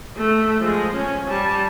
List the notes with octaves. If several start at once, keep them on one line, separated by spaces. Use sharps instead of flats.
A3
F3 G#3
C#4
G3 A5